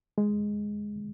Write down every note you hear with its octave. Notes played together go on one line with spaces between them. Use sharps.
G#3